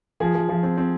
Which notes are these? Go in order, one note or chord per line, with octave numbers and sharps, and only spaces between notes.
F3 G#4
F3
F3
C4
C4